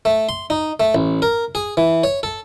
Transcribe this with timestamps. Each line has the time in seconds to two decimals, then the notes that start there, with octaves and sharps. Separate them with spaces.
0.05 A3
0.29 C6
0.50 D#4
0.80 A3
0.95 A1
1.22 A#4
1.55 G#4
1.77 E3
2.04 C#5
2.23 A4